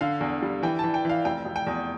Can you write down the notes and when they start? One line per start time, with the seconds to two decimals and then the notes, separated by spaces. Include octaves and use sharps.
0.01 D3 F5
0.21 E2
0.42 G3
0.63 E3 G5
0.79 E3 A5
0.94 G5
1.05 E3 F5
1.25 F1 G5
1.45 F1
1.56 G5
1.67 E2